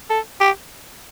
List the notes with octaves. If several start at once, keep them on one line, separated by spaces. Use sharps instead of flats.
A4
G4